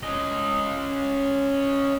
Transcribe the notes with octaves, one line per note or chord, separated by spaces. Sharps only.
C#4 D#5